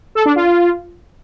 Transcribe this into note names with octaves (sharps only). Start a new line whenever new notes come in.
A4
D4
F4